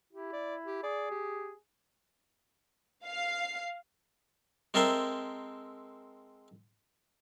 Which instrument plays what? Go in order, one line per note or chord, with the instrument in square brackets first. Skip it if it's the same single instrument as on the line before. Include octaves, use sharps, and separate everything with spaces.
[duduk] E4 [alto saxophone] G4
[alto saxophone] D5
G4
[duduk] G#4 [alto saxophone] D5
[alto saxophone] G4
[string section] F5 C7
[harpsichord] G#3 C4 A4 A#4 C5 E5